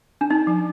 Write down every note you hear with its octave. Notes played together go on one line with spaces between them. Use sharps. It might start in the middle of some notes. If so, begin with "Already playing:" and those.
D4
C4 D#4
F3